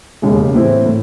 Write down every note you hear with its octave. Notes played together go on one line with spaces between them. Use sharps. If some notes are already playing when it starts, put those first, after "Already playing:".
E1 D#2 C#3 G#3
A2 E3 C4 E4
A2